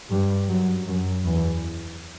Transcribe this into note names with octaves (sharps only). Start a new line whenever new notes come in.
G2 G3
F#2 F#3
F#2 F#3
E2 E3